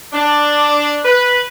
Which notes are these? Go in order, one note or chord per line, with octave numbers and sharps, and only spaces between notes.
D4
B4